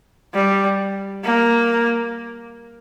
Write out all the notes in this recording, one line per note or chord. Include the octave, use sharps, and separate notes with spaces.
G3
A#3